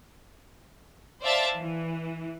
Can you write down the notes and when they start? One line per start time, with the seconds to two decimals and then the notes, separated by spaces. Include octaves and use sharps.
1.22 C5 D5 E5 F5 A5 A6
1.58 E3